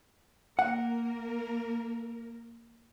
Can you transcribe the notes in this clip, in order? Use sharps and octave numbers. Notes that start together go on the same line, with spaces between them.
A#3 A#4 F#5